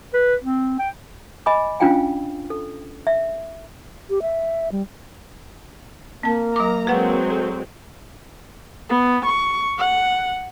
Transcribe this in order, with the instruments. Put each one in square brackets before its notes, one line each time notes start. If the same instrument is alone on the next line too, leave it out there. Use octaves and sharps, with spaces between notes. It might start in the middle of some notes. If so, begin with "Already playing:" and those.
[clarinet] B4
C4
G5
[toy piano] D#5 G#5 B5 D6
C#4 D4 F4 F5 G5 G#5
A4
E5
[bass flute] G4
E5
G3
[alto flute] A#3 [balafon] C4 A5
[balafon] F#3 D6 [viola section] A#5
[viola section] F#3 G#3 C4 [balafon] A#4 B4 F#5
[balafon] A4
[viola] B3
C#6
F#5